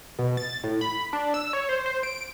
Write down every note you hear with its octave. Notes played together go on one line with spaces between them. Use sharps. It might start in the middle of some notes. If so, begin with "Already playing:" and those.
B2
A6
A2
B5
D4
E6
C#5
C5
C5
D7